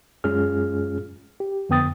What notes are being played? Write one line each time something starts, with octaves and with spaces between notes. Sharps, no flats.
F#2 G#3 C#4 F4 G#4 F6
G4
F2 D3 B3 G5 D#6 A6